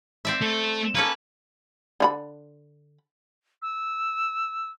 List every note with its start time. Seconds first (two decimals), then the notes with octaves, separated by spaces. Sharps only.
0.25 C4 D5 E5
0.41 A3 A4
0.95 A#3 C#4 A4 B4
2.00 D3 F4 B5
3.62 E6